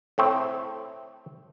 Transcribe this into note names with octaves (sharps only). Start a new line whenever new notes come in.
A2 A3 C4